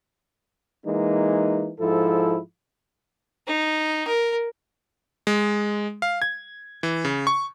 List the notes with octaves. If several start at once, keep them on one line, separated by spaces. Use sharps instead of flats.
E3 G#3 A#3 D#4
G#2 F3 E4 A4
D#4
A#4
G#3
F5
G#6
E3
C#3
C#6